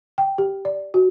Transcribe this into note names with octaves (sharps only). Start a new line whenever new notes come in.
G5
G4
D5
F#4